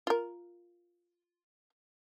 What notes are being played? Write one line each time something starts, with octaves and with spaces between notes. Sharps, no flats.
F4 A#4